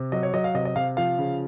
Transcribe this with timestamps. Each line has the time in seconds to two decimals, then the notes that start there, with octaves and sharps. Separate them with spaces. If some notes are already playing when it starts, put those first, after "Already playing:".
Already playing: C3
0.12 F#3 D#5
0.23 C#5
0.34 F#3 D#5
0.44 F5
0.55 C3 D#5
0.65 D#5
0.76 C3 F5
0.97 F3 F5
1.18 C#3